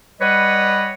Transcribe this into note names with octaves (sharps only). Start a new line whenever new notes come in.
G3 B4 C#5 D#5 F#5